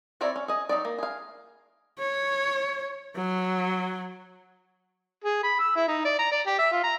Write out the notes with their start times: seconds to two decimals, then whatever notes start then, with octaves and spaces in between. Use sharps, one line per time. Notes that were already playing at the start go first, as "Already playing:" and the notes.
0.21 C4 E4 C#5 D5 A#5
0.36 C#4
0.48 G#4 D#5
0.69 F#3 D#4 D5
0.85 A#3
0.98 G#4 F5
2.00 C#5
3.16 F#3
5.24 G#4
5.43 B5
5.59 E6
5.76 E4
5.88 D#4
6.05 D5
6.19 A#5
6.32 D5
6.47 G4
6.59 E5
6.72 F4
6.83 A#5